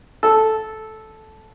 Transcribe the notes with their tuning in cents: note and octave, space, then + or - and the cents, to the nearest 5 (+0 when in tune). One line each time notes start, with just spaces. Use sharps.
A4 -10